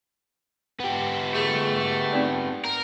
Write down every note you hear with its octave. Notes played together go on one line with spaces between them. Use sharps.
B3 G4
A3 G#4
C4 D#4 D5
A#4